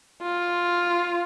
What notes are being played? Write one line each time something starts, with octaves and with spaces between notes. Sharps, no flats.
F4